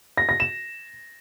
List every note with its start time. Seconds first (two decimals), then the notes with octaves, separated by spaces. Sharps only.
0.17 A#6
0.29 A#6
0.40 E7